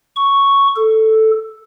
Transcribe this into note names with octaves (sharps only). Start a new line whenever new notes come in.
C#6
A4